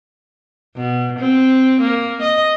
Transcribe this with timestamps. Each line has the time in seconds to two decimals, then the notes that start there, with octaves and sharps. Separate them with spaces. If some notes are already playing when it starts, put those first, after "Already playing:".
0.76 B2
1.19 C4
1.81 A#3
2.22 D#5